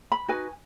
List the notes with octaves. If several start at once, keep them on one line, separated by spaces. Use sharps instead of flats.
B5
D#4 F#4 B4 G#5